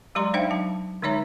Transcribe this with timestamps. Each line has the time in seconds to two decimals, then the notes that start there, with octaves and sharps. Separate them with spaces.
0.15 F#3 G#3 G4 D5 A#5 C6
0.34 D4 D#4 C5 E5 F5 G5
0.51 F#3 A5
1.02 D3 G#3 D#4 C#5 E5 A#5